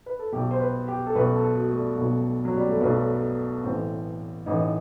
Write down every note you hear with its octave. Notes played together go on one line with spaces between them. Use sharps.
B4
A4
B1 B2 G4
C5
B4
G4
A4
B1 B2 B4
A4
F#4
A3
G3
B1 B2
F#3
G3
A3
B1 B2 B3
A1 A2 E3 C4
A1 A2 E3 D#4